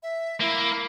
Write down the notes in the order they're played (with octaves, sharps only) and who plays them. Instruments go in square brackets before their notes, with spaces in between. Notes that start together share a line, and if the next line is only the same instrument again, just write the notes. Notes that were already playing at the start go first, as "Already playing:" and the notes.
[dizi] E5
[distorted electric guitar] A#3 [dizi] E4